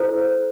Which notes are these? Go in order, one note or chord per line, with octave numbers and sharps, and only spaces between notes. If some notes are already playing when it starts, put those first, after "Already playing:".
Already playing: E4 A4 C5